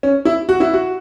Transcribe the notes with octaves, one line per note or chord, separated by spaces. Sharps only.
C#4
E4
F#4
E4
F#4